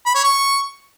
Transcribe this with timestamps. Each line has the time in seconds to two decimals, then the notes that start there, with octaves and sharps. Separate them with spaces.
0.06 B5
0.15 C#5
0.24 C#6